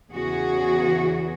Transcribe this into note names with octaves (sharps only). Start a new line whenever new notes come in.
E2 C#3 E3 F#4 G#4